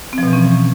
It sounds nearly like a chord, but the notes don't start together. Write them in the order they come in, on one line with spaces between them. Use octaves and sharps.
C4 F3 B2 E3 C#4